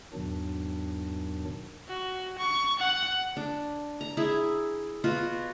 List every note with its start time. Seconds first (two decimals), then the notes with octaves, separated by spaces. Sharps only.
0.13 E2 G#2 B2 D#3 F#3 D4
1.88 F#4
2.38 C#6
2.79 F#5
3.37 D4
4.01 A#5
4.17 E4 G#4
5.04 B2 F4 F#4